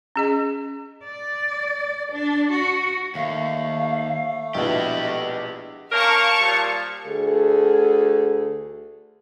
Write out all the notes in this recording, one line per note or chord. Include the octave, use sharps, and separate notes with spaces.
C#4 G#4 D#5
D5
D4
F#4
D#2 A3 F5
A#1 B2 E4 G4 B4 D#5
A#3 C#4 A#4 F5 A5 C#6
A#2 F3 G3
D2 G#4 A4